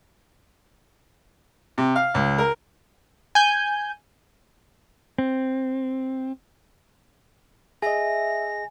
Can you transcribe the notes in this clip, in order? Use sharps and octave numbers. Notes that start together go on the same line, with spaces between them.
C3
F5
C#2
A#4
G#5 G6
C4
G#4 D#5 E5 G#5 A#6